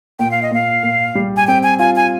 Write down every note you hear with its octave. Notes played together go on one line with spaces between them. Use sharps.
A#2 G5
F5
D#5
A#2 F5
A#2
G3
G#5
C4 G5
G#5
F4 G#5
G#5